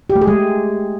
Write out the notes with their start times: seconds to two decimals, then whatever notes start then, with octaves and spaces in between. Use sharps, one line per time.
0.10 G4
0.16 A3
0.21 G#4
0.27 G#3